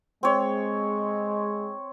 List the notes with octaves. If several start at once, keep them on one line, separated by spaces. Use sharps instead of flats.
G#3 C4 C#5